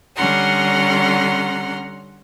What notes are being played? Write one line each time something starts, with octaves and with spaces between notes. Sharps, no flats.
D3 G3 C#4 F#5 A#5 C6